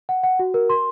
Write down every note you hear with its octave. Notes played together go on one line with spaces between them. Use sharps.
F#5
F#5
F#4
A#4
C6